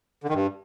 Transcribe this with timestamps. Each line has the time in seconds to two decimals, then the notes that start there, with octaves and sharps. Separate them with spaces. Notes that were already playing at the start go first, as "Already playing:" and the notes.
0.23 D3
0.29 D#3
0.34 G2